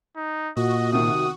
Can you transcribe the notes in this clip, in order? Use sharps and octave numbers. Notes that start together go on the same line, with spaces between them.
D#4
A#2 F#4 D#5
C2 C3 D#3 D#6